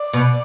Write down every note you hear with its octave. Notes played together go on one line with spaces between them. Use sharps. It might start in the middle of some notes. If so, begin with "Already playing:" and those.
Already playing: D5
B2